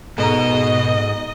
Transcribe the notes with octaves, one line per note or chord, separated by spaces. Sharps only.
G#2 B2 A4 D#5 A#5